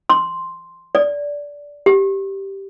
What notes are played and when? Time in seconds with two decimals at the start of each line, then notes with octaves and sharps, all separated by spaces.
0.10 C6
0.95 D5
1.86 G4